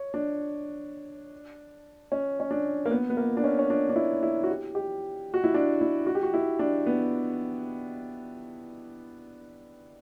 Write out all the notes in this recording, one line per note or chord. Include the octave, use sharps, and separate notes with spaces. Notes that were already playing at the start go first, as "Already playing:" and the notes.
Already playing: C#5
D4
C#4
C#4
D4
A#3
B3
B3
A#3
D4
C#4
C#4
D4
D4
E4
E4
F#4
G4
G4
F#4
E4
D4
E4
F#4
G4
F#4
E4
D4
B3